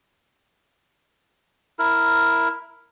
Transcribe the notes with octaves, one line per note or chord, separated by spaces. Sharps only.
E4 A#4